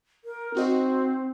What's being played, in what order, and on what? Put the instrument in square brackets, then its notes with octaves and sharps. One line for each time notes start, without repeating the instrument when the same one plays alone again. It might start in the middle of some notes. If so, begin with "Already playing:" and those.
[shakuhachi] A#4
[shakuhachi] C4 [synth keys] D#4 F#4 D#5